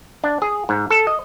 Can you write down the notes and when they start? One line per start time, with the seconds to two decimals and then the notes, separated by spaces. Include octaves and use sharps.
0.24 D4
0.42 G#4
0.69 G#2
0.91 A4
1.07 D#5